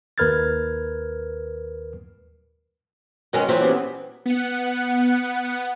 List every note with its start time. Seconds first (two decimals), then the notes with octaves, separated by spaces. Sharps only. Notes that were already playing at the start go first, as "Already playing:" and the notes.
0.18 D#2 A#4 B4 F6 G#6 A6
3.33 D#3 F#3 G#3 C#4 B4
3.49 A#2 E3 F#3 C4
3.61 B3 C#4 G4
4.26 B3 F#5